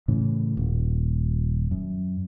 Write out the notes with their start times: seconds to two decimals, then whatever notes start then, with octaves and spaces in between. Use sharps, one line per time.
0.08 A2 C#3 E3
0.57 D#1
1.71 F#2